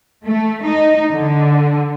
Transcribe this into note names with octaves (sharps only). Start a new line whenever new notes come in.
A3
D#4
D3